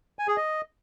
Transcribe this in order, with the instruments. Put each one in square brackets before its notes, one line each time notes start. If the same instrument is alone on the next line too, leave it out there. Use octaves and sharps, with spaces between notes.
[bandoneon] G#5
G#4
D#5